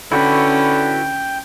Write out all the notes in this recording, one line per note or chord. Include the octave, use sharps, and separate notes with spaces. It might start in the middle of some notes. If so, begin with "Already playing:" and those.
D3 C#4 E4 F#4 B4 G5